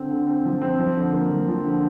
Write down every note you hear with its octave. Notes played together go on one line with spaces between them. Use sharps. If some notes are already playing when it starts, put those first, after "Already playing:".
Already playing: D3 C4
D3
C4
F3
C4
F3
D3
A#3
F3
F3
D3